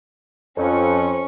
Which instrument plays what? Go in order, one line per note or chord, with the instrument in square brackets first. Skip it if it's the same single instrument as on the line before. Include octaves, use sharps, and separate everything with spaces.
[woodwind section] F2 [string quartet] C#4 C#6